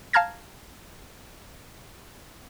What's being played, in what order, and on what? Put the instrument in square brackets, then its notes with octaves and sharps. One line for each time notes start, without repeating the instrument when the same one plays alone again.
[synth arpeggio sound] F5 A5 A#5 F6 G#6 A#6